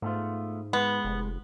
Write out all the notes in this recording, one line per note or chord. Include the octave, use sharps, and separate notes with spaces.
G#2 A3 B3 F4
G#3 B3 B4
F1